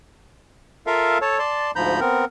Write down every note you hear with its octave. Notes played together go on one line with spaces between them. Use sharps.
F4 A4 A#4 E5 F5
A4 C#5 A5
D5 A5 C6
D2 G#2 F3 A#5 B5 G6
B3 C4 A#4